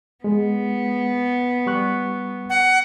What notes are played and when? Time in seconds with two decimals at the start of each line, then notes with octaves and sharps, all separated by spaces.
0.24 G#3 B3
1.67 G3 C#6 F#6
2.50 F#5